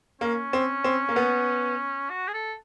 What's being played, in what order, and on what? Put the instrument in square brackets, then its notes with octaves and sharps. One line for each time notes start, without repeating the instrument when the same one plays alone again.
[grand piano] A#3 [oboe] C#4
[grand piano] C4
C4
A#3
B3
[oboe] F#4
G#4
A4